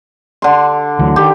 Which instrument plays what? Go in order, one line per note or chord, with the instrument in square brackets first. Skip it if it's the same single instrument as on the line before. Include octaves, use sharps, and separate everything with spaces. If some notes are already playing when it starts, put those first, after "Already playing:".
[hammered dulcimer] D3 C6
[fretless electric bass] D2 E3 F#3
[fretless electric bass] D#3 [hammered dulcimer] G4